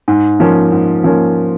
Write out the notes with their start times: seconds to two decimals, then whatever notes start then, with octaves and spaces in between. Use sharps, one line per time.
0.08 G#2
0.40 F3 A#3 C#4
0.72 G#2
1.04 F3 A#3 C#4